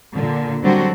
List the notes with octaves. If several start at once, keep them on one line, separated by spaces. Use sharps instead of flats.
A#2 D3
D3 F#3 G3 C4 D4 F#4